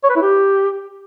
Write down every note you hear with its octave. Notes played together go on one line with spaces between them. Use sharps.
C#5
B4
E4
G4